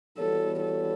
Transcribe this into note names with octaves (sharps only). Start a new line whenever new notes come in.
E3 G3 B3 F#4 A4 C#5
A4